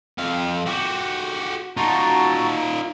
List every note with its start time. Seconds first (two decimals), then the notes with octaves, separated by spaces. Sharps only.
0.18 F2 F5
0.66 F#4 G4
1.77 D#4 F4 F#4 A5 A#5